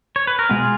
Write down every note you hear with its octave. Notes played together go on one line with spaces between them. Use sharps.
C#5
B4
A#4
B2 G#3 B3 F4 G#4